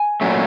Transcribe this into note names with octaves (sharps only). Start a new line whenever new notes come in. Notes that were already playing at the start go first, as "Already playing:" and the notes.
Already playing: G#5
A#2 F#3 A3 C#4